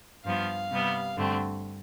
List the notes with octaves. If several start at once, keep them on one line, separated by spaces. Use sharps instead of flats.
G2 F3 B3 F5
C3 G3 B3
G2 D3 A3 C4